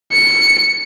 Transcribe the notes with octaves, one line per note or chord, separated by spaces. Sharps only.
C#7